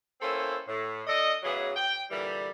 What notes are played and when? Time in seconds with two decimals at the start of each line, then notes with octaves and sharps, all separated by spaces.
0.20 A#3 C4 C#4 E4 A4 C5
0.67 A2
1.07 D4 A4 D5 D#5
1.43 C#3 E3 F#3 B3 G#4
1.75 G5
2.10 A#2 D3 E3 G3